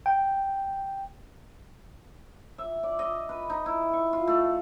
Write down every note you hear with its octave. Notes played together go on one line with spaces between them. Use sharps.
G5
E5
D5
D#5
B4
D#4
E4
C#6
F4
A3